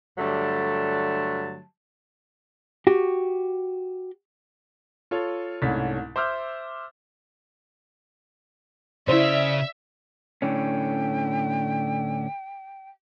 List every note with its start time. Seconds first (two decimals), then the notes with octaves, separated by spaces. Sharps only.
0.18 G2 D3 F#3 G3 A3 A5
2.87 F#4 G4
5.11 F4 A4 C#5
5.62 C2 G#2 A3 C#4 A6 B6
6.16 C5 E5 D6 E6 F6 G6
9.08 C#3 E4 C5 D5 E5
10.42 A2 D3 C#4 G5